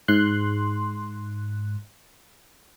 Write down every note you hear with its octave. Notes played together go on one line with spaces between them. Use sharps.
G#2 C6 F#6